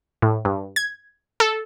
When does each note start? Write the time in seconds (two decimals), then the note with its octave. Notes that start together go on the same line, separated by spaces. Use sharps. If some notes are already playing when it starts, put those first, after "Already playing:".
0.22 A2
0.45 G2
0.76 G#6
1.40 A4